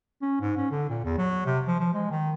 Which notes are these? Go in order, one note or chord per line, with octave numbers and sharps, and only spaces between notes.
C#4
G#2
C#4
D3
A#2
E2
F#3
C3
F3
F3
G#3
D#3